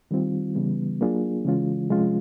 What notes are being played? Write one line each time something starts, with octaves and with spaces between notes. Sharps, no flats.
D#3 G3 C4 F4
C#3 E3 G3 B3
F#3 A#3 D4 F4 G#4
C#3 E3 G#3 C#4 F4
C3 F3 G#3 C#4 F4